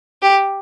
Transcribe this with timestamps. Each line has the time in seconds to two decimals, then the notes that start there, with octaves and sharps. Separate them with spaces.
0.22 G4